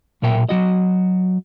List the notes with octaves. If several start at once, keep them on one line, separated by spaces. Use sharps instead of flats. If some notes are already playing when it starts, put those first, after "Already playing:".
B1 A#2 A#4 E5 G5
F#3 F#4 D#5